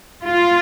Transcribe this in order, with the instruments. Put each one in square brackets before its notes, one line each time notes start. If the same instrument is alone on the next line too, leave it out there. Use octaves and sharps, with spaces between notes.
[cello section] F4